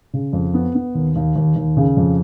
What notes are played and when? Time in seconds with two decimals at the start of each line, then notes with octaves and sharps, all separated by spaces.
0.13 C#3
0.33 F2
0.54 B3
0.75 B3
0.95 D#2
1.16 D#2
1.36 D#2
1.56 D#2
1.77 C#3
1.97 F2